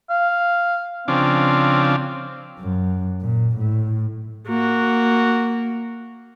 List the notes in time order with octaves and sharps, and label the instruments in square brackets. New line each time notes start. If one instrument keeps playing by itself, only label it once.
[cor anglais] F5
[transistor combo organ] C#3 F3 D4 [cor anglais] C4
[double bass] F#2
A#2
A2
[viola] A#3 F#4